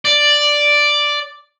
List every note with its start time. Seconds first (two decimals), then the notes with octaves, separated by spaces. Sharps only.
0.05 D5